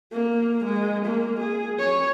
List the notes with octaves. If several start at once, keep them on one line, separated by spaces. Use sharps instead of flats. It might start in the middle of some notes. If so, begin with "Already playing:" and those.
A#3
G#3
A#3
G#4
C#5